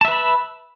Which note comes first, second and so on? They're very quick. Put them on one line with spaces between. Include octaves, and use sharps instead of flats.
A5 E5 B4 B5